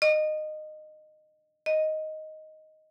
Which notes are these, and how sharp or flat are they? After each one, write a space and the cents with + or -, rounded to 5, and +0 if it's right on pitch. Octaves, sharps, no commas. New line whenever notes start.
D#5 -20
D#5 +5